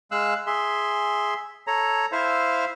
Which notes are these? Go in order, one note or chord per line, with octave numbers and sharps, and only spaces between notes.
G#3 F5 E6 F#6
G#4 E5 C6
A4 C#5 A#5
E4 C5 E5 F5